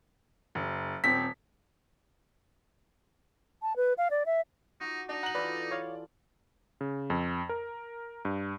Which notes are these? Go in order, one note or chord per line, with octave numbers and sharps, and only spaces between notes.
F#1
D#1 C4 B6
A5
B4
F5
D5
E5
D#4 F#4 D6
D4 D#4
F#5 A#5 F#7
E3 F4 A4 B4 D5
C#5 F5
C#3
F2
A#4
G2